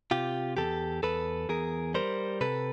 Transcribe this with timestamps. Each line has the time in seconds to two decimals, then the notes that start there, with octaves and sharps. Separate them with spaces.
0.11 C3 F4 G4
0.57 E2 G4 A4
1.03 E2 A4 B4
1.49 E2 G#4 A#4
1.94 G3 A#4 C5
2.41 C3 A4 B4